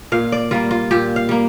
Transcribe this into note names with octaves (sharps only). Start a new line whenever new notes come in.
A#2 F5
D5
G3 A#3 F4
F4
A#2 G4
F5
G3 A#3